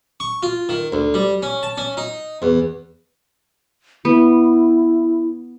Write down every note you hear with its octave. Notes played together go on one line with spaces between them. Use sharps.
C#6
F4
D#3
D2
G3
C#4
A5
C#4
D#4
E2
B3 E4